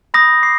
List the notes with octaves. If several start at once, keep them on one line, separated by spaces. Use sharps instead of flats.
B5 D#6 G6 A#6
D6 C7